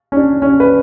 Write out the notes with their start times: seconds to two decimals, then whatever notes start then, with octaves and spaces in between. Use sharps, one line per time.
0.12 C#4
0.17 D4
0.42 C#4
0.60 B4